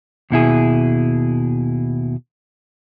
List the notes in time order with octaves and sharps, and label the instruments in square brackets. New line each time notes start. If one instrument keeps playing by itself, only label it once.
[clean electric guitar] D#2 B2 E4 G#4